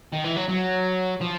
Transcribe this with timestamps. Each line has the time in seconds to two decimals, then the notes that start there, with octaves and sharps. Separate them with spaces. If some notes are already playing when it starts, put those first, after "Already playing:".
0.13 D#3
0.24 E3
0.36 F#3
0.49 F#3
1.21 F3